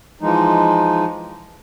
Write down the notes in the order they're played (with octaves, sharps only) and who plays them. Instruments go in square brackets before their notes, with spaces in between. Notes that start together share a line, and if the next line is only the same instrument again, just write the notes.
[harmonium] E3 F3 G#3 D#4